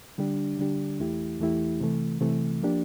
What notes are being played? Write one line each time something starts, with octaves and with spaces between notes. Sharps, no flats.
D3 G3 D4 G4
D3 G3 D4 G4
E2 E3 A3 E4 G4
E2 E3 A3 E4 G4
C3 E3 A3
C3 E3 A3
F3 A#3 D4 G4